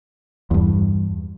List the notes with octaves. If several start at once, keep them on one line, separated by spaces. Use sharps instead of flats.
E2 G2